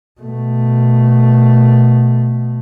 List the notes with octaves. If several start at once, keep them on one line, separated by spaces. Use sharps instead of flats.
B2 A3